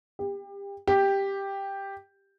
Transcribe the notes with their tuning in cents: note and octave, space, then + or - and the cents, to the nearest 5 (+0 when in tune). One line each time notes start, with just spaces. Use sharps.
G4 +30
G4 +5